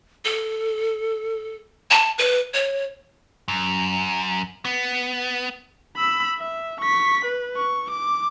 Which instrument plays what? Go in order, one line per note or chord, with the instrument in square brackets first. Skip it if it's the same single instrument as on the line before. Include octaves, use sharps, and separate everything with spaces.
[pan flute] A4
A5
B4
C#5
[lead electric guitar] F#2
B3
[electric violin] B5 E6
E5
C#6 B6
B4
C#6
D6